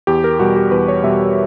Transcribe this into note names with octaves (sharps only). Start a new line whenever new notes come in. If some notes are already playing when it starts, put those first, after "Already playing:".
E2 G4
A#4
B2 G3 F#4
G4
E2 B4
C#5
B2 G3 E5